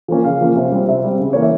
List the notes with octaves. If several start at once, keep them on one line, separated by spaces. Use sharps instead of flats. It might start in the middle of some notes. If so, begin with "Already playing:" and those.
F3 A#3 C#4
C#3 F5
F3 A#3 C#4
C3
G3 C4
C3 E5
G3 C4
C#3
E3 A#3 C#5
E5